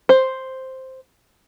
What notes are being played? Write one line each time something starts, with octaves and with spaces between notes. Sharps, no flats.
C5